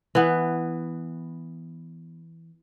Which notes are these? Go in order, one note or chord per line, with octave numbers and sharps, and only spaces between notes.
E3 B3